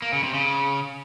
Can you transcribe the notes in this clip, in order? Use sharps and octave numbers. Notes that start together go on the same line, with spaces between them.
A#3
C#3
C3
C#3